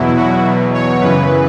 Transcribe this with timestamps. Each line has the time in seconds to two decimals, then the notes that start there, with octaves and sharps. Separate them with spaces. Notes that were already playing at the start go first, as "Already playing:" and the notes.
Already playing: E2 B2 F#3 E4
0.17 F#4
0.46 E2 B2 F#3
0.74 C#5
1.01 F#2 C#3 E3 B4